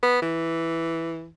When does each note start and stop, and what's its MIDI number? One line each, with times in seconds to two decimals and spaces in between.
0.03 0.22 59
0.22 1.28 52